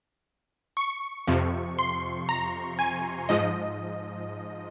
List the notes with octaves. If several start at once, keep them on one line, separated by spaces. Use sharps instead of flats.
C#6
F2 C3 F3
C6
A#5
G#5
G#2 F3 D#5